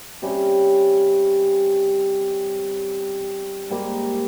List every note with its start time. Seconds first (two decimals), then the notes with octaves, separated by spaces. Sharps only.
0.22 C3 G3 C#4
3.70 G#2 G3 A#3